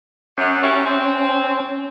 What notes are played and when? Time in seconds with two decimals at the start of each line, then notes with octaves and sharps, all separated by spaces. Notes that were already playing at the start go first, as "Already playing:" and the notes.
0.38 F#2 C#4
0.63 G3 E4 F#4
0.86 C4